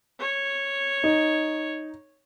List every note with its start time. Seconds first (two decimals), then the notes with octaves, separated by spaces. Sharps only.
0.20 C#5
1.04 D#4